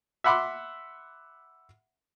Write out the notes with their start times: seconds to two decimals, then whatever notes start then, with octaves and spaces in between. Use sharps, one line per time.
0.24 E5 F#5 B5 C6 D6